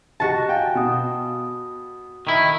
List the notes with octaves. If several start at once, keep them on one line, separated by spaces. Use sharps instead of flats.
F#4 G4 D#5 A5 A#6
F5 G5 G#5
B2 F#5 D#6
D#3 E4